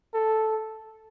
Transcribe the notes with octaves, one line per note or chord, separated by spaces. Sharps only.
A4